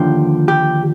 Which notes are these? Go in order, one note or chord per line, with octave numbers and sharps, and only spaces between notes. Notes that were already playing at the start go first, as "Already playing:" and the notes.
Already playing: D#2 D3 F3 G4
G4